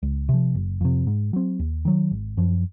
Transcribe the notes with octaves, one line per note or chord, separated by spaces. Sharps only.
C#2
C3 F3
F#1
F2 C3
G#2
F#3 C4
D#2
D#3 F#3
G#1
F#2 F3